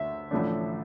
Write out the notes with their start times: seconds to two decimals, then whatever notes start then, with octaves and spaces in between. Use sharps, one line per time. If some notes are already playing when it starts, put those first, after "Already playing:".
Already playing: D2 D3 A3 E5
0.31 A1 A2 F3 A3 D4